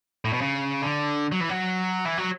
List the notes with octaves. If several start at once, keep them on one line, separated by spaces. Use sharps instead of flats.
A2
B2
C#3
D3
F#3
E3
F#3
E3
F#3